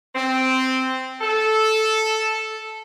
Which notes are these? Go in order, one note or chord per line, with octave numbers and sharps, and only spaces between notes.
C4
A4